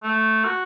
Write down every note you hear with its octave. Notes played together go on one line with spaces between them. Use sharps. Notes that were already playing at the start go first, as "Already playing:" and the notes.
A3
F#4